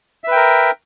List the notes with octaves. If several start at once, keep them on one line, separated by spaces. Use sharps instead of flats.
A#4 B4 E5 G5